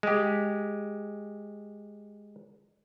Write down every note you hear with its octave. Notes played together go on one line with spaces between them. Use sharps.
G#3 G4